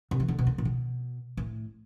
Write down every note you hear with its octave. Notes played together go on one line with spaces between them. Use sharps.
C3
E3
D3
B2
D3
A2
B2
A2